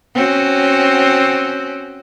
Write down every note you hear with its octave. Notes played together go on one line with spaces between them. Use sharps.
C4 C#4 F#4